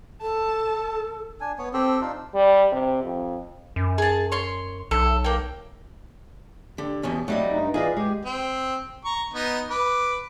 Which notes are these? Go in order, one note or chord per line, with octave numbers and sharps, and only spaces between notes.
A4 A5
D4 G#5
B3 C#5
C4 G4 A4
D4 D#4 F4
G3
C3
F2
F#2
G#4 A5
C#5 C6
B1 A4
A#3 G5
D3 G4
E2 B2 C#4
F#3 G3 A3 C4 D#5
G2 D#4
E3 F4 G#4 B4 D5 D#5 F5
G#3 G4
C4
A#5 C#6
B3 D#4
B4 D6